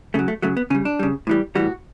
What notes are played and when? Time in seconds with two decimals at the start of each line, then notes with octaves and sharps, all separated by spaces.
0.14 C#3 F#3 A3
0.28 A3
0.42 C#3 F#3 A3
0.57 B3
0.70 C#3 C#4
0.75 G3
0.85 D4
0.99 C#3 G3
1.27 A2 E3 G3
1.55 A2 E3 G3 F#4